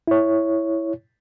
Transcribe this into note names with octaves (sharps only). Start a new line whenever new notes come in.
E4 C#5